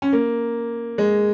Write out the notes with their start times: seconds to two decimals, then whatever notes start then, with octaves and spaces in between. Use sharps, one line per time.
0.02 C#4
0.13 A#3
0.98 G#3